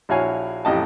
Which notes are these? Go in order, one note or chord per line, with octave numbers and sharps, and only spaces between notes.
A#1 E4 F#4 C#5 F5 G#5
A1 F2 G4 D#5 G5 A5